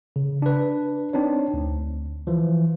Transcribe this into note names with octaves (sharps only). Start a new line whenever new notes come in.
C#3
D4 B4
C4 D4 D#4 C#5
D2
E3 F3